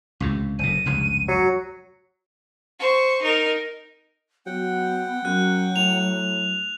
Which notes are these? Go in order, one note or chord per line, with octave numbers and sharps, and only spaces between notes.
C#2 A2 C3
F#1 A2 D#7
F1 C#2 G2
F#3 C#7
C5 C#6
D#4 A#4
F#3 B3 F#5 G5
F#2 F#3 F#6
A2 F7